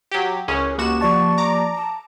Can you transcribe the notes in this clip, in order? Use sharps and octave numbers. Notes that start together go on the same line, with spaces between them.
F#3 G4
C#2 C#4 G#4 A#4 C#5
C#2 A#3 F#4 G4 E7
F3 D5 A5 C#6
A#5 D6
A5